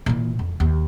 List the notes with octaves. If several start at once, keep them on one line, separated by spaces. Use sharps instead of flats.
A#2 E3
F2
D#2